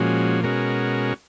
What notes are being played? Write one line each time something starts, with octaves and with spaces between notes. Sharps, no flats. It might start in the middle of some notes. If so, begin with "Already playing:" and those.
Already playing: A#2 F3 G#3 C#4 F#4
B2 G#3 C#4 F#4 A#4